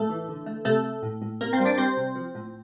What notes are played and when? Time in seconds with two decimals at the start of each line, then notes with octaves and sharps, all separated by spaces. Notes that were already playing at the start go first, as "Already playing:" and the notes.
Already playing: A2 A3 A4
0.09 E3
0.29 D3
0.46 A3
0.65 C3 A3 A4
0.84 A3
1.03 A2
1.22 A2
1.41 C3 A#3 A#4
1.53 C4 C5
1.59 G3
1.65 D4 D5
1.78 G3 C4 C5
1.97 C3
2.15 F3
2.35 A2